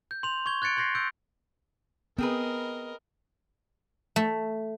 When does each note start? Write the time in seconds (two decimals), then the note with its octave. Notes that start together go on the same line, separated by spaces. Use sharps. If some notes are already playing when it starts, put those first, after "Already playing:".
0.11 G6
0.23 C6 F7
0.46 C#6 G6 G#6 G7
0.62 F#6 G#6 A6 C#7 D7
0.77 C6 G6 G#6 A#6 C7
0.95 E6 G6 G#6 D7
2.18 B3 C4 G#4 A#4 B4 D#5
4.16 A3